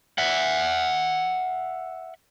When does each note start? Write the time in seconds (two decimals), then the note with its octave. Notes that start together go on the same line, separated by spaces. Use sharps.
0.18 E5 F#5